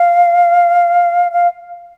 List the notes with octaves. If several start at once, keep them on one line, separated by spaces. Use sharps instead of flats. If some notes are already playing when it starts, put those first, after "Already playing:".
Already playing: F5
F5